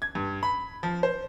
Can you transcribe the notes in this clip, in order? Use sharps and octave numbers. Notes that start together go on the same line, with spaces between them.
G#6
G2
B5
F3
C5